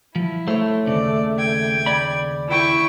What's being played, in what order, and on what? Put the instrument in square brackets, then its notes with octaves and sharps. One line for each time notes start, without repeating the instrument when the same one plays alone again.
[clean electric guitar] F3 [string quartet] E4
[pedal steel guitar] A3 [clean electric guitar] C5 C#5
[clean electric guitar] D#2 A#2 C#3 [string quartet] D5
[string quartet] G5 G#6
[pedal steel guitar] D5 B5
[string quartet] E4 G5 C#6